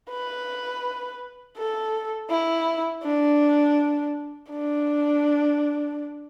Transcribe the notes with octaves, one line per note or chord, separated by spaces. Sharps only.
B4
A4
E4
D4
D4